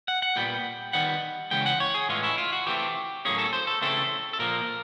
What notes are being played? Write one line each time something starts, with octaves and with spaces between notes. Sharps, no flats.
F#5
F#5
A#2 G3 B3 G5
D#3 G3 B3 F#5
C#3 E3 G#3 B3 G5
F#5
C#5
G#4
A2 E3 G#3 C#4 F4
E4
F4
F#4
E3 A3 C4 G4
A2 F#3 A#3 C#4 G#4
A4
C5
A4
C#3 E3 A3 C4 A4
A4
A#2 F3 A#3 A#4